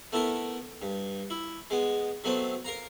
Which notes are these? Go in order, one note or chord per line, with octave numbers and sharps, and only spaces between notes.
A3 B3 E4 A4 A#4
G2
E4
G#3 B3
F#3 A3 B3 C4
A#4 F5 A#5